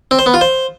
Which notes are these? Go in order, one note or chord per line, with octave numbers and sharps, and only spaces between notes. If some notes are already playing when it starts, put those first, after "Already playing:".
C4
C5
B3
F4
C5